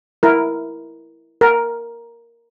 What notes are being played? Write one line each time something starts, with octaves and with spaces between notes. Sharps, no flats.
E4 A#4
A#4